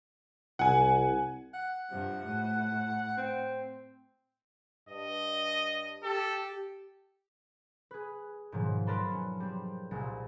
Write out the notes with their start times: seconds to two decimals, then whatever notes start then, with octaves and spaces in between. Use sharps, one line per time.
0.59 C2 F#5 G#5
1.54 F#5
1.89 G2 C3 F3
2.25 A2
3.17 C4
4.89 G2 D#5
6.03 G4 A4
7.91 G#4 B4
8.52 G#2 B2 D#3 F3 F#3
8.87 A#4 B4 D5 A5 B5 C6
9.12 C#4
9.40 G3 C4
9.91 C2 A#2 G#3